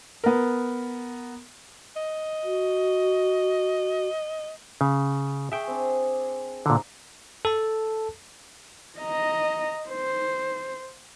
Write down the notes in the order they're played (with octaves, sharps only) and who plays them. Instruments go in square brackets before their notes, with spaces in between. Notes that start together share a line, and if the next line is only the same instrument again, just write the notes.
[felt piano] B3 A#4
[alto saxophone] D#5
[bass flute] F#4
[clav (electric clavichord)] C#3
[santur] G#4 C#6 [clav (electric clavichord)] E5 G5
[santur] C4 D4
[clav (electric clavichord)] A#2 D3 [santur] D#4
[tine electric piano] A4 A5
[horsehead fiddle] D#5 A#5
C5